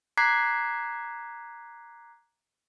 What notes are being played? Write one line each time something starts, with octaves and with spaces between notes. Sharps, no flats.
A#5 D6 F#6 G#6 B6 C7